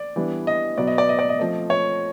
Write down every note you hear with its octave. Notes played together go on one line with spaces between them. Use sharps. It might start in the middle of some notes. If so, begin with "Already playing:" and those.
Already playing: D5
E3 G3 B3 D4
D#5
B2 F#3 B3 D5
D#5
D5
D#5
D5
D#5
F3 A3 C4 D#5
C#5